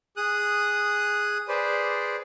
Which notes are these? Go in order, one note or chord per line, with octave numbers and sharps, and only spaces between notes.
G#4 D#6 F#6
G#4 B4 C5 D5